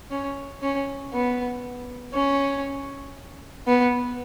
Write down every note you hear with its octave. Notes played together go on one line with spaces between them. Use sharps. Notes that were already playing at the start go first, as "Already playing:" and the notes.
C#4
C#4
B3
C#4
B3